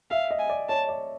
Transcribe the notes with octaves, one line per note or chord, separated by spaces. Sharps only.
E5 F5
D#5
G#5
D5
C#5 A5
D5